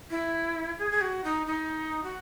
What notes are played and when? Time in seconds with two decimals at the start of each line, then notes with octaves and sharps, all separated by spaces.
0.10 E4
0.79 G#4
0.91 G#4
1.01 F#4
1.24 D#4
1.47 D#4
2.03 F#4